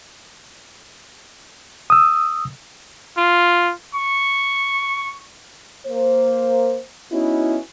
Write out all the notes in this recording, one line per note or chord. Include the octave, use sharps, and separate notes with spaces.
D#6 E6
F4
C#6
A#3 C5
B3 C#4 D#4 E4 F#4